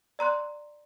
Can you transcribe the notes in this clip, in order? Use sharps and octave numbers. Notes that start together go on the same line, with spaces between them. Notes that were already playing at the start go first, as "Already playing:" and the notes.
D5 A#5 C6 F#6